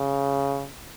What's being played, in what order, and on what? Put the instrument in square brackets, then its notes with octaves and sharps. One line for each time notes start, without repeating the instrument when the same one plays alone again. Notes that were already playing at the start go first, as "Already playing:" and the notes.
Already playing: [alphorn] C#3